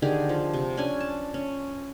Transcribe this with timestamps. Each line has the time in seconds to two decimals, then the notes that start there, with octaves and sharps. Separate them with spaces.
0.02 D3 D#3 G4 G#4
0.29 F3
0.53 C3
0.77 C#4 D4 G#5
1.00 A5
1.34 C#4